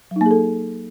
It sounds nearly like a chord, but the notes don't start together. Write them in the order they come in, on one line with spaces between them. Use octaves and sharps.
F#3 D#4 A#3 G#4 A4